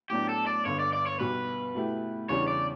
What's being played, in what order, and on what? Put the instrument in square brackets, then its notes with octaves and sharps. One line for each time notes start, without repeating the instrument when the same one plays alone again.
[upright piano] A2 F#3 B3 D4 [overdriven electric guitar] G4
[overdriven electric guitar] A4
D5
[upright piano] G1 G2 D3 [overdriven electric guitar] C#5
[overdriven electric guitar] D5
D5
C#5
[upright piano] B1 B2 G3 [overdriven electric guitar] B4
[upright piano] B2 A3 E4 G4
[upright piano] E2 C#3 E3 G3 D4 [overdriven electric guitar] C#5
[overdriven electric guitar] D5